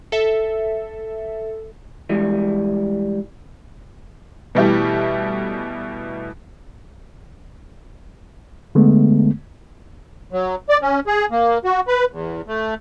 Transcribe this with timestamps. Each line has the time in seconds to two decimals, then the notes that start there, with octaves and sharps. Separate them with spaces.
0.12 A4 E5
2.09 E3 G3 G#3
4.55 B2 E3 G3 A3 E4 G4
8.75 D3 G#3 A3 B3
10.33 F#3
10.69 D5
10.82 C#4
11.07 G#4
11.31 A#3
11.64 F#4
11.88 B4
12.12 E2
12.48 A3